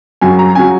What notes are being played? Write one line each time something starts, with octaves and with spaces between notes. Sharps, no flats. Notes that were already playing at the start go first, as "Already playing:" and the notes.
F#2 C#3 F#3 G#5
A#5
C#3 F#3 G#5